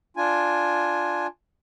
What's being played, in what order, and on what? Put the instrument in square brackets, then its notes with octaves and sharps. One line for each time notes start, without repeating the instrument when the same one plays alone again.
[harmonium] D4 F4 G#5